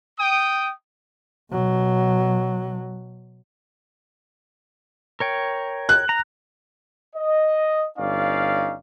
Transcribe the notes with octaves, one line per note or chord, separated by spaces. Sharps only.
G5 D#6
B2 F#3
A#4 C#5 G5
F#6
A#5
D#5
G1 C#4 D#4 D5 F5